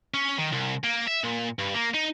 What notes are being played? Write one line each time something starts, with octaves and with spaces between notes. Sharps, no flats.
C#4
D#3
C2
A#3
E5
A#2
G2
A#3
D#4